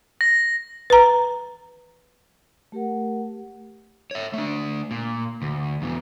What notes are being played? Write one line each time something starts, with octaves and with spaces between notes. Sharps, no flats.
A#6
B4 A#5
A3 G4 A#4 F#5
C#5 E5
A3 D4
A#2
D2
E2 B2